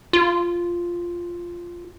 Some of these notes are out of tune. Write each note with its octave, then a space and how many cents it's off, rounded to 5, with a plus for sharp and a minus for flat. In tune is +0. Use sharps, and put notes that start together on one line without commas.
F4 -5